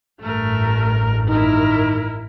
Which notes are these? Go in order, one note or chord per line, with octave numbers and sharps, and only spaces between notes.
A1 G2 A3 A#4
D#3 E4 A#4